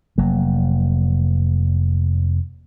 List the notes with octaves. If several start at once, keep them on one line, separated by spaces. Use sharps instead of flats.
F1 F#3 A#3